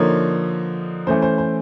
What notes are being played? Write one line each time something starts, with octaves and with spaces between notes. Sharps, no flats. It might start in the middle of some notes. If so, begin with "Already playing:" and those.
Already playing: D3 F3 A#3 D#4 C#5
E3 A3 C#4 C5
C5
C5